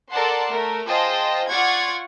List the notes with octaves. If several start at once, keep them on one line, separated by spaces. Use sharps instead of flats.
A4 A#4 D5 F#5 A5 C6
A3 A#4
F4 G#4 C5 D#5 G5 A5
F4 D5 F#5 C#6 G#6